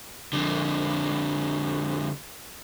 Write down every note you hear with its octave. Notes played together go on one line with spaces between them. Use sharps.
F2 D3